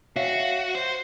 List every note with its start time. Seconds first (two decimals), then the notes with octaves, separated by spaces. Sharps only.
0.16 F#4 C#5 E5 F5
0.75 C5